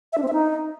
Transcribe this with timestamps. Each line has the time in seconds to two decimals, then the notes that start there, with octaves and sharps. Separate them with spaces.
0.13 E5
0.18 D4
0.23 C4
0.28 E5
0.33 D#4